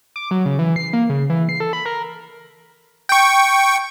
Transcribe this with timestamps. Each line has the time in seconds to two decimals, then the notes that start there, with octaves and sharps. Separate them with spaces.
0.16 D6
0.31 F#3
0.46 C#3
0.59 E3
0.76 C7
0.93 A#3
1.09 C#3
1.30 E3
1.49 C7
1.60 A4
1.73 B5
1.86 A#4
3.09 G5 C#6